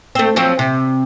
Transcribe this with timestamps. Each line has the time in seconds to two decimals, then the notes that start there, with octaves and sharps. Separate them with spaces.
0.15 A3 C4
0.36 F3 F#3 C4
0.59 C3